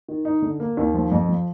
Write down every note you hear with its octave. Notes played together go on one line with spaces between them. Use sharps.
D#3
D#4
D3
A#3
D#2
F3
F2
F3